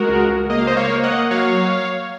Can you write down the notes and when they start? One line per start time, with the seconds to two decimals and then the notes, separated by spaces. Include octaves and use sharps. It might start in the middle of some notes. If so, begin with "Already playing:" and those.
Already playing: G#3 F#4 A#4
0.09 C#2
0.30 C#2
0.50 A#3 D#5
0.58 F5
0.67 C5 D#5
0.70 A#3
0.77 C#5 F5
0.90 A#3
1.03 D#5 F#5
1.11 A#3
1.31 F#3 C#5 F5